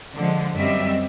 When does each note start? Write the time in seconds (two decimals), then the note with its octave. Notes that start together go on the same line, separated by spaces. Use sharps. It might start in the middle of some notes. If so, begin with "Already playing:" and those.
0.15 D3 F3 G#3
0.55 F#2 G3 C4 D#5 E5